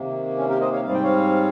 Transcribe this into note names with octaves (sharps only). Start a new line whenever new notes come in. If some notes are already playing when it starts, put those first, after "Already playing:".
Already playing: C3 D#3 A#3
C#4
G4 A#4
C5 D#5
C#5 F5
G#2 G3 C4 F5
G5
C#5 F5